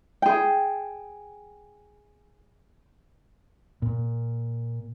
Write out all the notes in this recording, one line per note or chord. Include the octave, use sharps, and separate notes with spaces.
G#4 G5
A#2